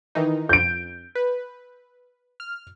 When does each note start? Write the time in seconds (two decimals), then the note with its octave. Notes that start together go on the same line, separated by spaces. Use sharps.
0.15 D#3 E3 D#4
0.49 F2 G6 D7
1.15 B4
2.40 F6